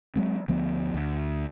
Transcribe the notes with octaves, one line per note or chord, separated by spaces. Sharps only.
F#3 G#3 C4
D2 F3 B3
D2